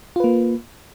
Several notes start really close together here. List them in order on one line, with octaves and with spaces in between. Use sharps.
F4 B4 A#3